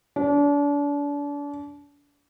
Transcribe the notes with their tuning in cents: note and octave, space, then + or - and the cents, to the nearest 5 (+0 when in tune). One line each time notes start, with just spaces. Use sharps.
D4 -35